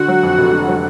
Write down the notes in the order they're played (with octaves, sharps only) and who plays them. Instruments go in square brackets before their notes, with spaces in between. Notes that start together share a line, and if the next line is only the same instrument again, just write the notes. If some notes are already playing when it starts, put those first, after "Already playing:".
Already playing: [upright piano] D3 [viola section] F#4 F#5
[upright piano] F#3
F2
F1
D3
F#3